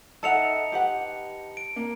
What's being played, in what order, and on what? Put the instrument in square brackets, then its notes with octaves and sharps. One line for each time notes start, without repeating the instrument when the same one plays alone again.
[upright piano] D#4 [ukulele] A4 E5 F#5 [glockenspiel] A5 C#7 F7
[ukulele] G4 B4 F#5
[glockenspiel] D7
[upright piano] A#3